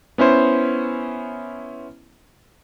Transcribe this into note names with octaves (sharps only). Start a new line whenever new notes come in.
B3 C#4 E4 C5